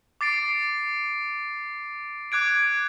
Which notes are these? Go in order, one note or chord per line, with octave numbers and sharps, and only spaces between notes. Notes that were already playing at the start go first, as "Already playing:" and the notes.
D6 A6 C7 D7
D6 F#6 G#6 D7